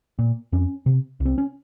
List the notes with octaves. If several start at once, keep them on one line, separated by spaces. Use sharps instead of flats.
A#2
F2 C#4
C3
C2
C4
C#4